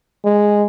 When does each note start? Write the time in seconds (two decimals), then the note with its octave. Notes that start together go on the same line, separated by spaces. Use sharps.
0.25 G#3